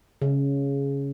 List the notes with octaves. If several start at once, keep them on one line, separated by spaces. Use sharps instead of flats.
C#3